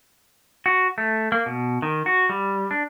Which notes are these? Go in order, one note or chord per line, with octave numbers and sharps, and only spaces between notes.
F#4
A3
A#3
B2
D#3
F#4
G3
D4